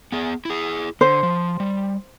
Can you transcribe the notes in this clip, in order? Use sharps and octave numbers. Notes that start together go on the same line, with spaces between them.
B3 G#4
E4 G#4
D3 C5
F3
G3